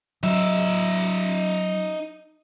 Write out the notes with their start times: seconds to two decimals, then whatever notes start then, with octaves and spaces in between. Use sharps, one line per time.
0.23 F#3 D#4 E5